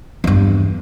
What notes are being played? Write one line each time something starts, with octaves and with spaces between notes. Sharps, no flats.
E2 G2